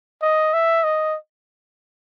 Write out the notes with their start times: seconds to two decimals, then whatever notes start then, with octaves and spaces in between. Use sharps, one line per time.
0.22 D#5
0.53 E5
0.83 D#5